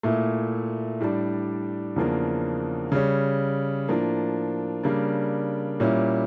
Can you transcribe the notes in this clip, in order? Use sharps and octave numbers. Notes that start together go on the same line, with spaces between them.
A#2 A3 E4
A2 G3 D4
E2 C#3 F3 A#3 D4
C#3 G3 C#4
A2 F3 A#3 D4
C#3 G3 A#3 D4
A#2 G3 C#4 E4